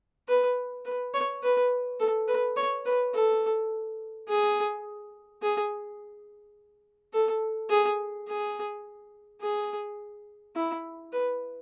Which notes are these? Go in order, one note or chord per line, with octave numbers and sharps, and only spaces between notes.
B4
B4
C#5
B4
A4
B4
C#5
B4
A4
G#4
G#4
A4
G#4
G#4
G#4
E4
B4